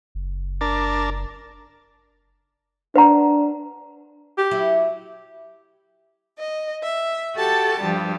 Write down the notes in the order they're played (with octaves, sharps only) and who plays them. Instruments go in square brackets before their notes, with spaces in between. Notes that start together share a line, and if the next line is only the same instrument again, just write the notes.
[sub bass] F#1
[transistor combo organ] D4 A#4 A5
[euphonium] D4 [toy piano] B4 F#5 A#5
[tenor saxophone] G4
[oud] F#3 E4
[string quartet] D#5
E5
F#4 G4 A4 A5
G2 F3 G3